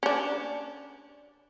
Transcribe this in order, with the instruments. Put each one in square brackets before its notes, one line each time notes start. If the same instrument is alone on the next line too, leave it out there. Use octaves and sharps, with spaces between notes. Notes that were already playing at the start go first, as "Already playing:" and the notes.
[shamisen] C#4 D4